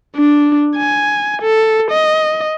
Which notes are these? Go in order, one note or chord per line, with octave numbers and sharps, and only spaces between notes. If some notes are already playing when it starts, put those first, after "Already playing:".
D4
G#5
A4
D#5